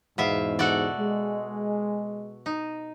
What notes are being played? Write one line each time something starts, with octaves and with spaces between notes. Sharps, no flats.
E2 G#2 B2 E5 F5
F#4 A4 D5
G#3
D#4